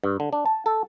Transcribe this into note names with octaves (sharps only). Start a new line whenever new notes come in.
G2
D3
D4
A5
A4